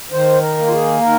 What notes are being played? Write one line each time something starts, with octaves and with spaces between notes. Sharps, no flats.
D#3 C5
A#4
A#3
F4
G#4
D#3 A#4